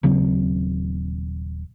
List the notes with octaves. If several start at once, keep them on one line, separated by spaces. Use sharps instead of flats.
D#1 C#3 F#3 C4